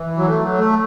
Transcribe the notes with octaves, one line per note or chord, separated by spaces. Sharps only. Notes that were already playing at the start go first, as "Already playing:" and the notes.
Already playing: E3
F#3
A3
F#3
A3